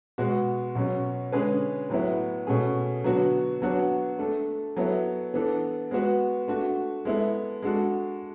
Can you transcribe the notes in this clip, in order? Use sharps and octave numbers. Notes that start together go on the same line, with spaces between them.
B2 G#3 B3 F#4
B2 F#3 C#4
D3 G#3 C#4 G#4 B4
A2 F#3 B3 E4
B2 A3 C#4 G#4
D3 F#3 B3 D4 F#4
F#3 B3 D4 F#4
A3 D4 A4
F#3 B3 E4 A4
E3 B3 D4 A4
G#3 B3 F#4 B4
A3 D4 F#4
G#3 B3 E4 A4
G#3 D4 F#4 A4